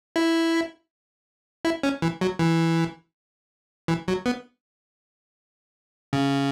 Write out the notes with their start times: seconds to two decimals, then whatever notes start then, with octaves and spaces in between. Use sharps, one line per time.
0.16 E4
1.65 E4
1.83 C#4
2.02 E3
2.21 F#3
2.39 E3
3.88 E3
4.08 F#3
4.26 B3
6.13 C#3